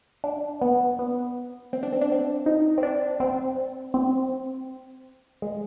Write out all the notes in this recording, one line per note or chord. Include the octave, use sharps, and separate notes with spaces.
D4
B3
B3
C4
D4
C4
D4
C4
D#4
C4
D4
C4
C4
G#3